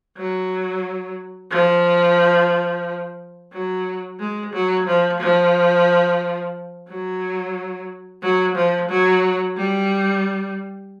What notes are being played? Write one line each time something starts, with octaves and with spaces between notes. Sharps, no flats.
F#3
F3
F#3
G#3
F#3
F3
F3
F#3
F#3
F3
F#3
G3